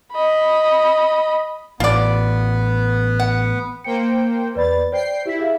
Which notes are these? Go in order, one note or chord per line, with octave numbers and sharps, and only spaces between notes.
D#5 B5
A1 B3 F4 D5
F#5
A#3 C5 G5 C#7
E2 B4 D5 B5 A6
C5 D5 G5 C7
E4 G4 B6
G#4 E5 F5